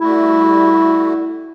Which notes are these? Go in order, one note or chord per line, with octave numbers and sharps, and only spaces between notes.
G3 A3 E4 F#4